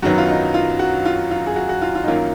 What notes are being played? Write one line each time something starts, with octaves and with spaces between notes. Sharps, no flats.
F#2 D#3 F#3 B3 F#4
F4
D#4
F4
F#4
F4
F4
G#4
F#4
F#4
F4
F4
D#4
F#2 D#3 F#3 A#3 C#4 F4